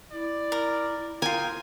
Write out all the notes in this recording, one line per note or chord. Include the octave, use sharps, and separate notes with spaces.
E4 D5
A#4
F4 G#4 A#4 G5 G#5